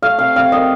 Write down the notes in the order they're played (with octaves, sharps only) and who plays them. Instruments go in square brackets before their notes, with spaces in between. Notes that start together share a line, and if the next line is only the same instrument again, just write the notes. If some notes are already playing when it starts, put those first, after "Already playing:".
[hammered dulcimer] A3 F5
C3 F5
C3 F5
D#3 D#5